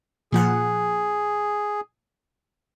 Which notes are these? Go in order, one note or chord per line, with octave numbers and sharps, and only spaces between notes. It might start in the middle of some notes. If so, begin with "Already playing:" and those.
A#2 F3 G#4 F#5